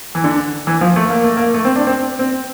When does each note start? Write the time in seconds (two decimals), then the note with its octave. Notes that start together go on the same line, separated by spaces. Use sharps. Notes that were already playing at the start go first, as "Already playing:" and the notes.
0.15 E3
0.24 D3
0.67 E3
0.81 F3
0.96 A3
1.10 A#3
1.24 A3
1.37 A#3
1.54 A3
1.65 C4
1.76 D4
1.87 C4
2.19 C4